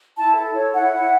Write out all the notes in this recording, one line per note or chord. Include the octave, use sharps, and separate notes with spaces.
E4 A5
A4
C#5
E4 F#5
E4